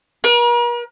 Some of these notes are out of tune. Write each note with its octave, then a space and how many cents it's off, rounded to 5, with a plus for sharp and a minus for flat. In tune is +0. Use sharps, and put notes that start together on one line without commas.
A#4 +45